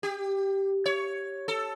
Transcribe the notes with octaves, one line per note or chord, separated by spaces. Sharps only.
G4
C#5
A4